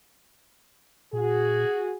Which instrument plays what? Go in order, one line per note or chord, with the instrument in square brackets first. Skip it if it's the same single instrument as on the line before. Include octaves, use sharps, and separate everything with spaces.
[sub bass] A#2 [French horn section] F#4 G#4